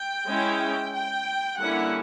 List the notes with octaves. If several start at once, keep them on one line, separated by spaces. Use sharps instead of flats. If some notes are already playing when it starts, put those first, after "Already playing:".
Already playing: G5
G#3 C#4 E4
G5
D3 G3 A#3 C#4 E4 F#5